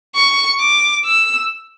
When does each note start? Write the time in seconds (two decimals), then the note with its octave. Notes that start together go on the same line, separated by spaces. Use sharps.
0.15 C#6
0.60 D6
1.05 E6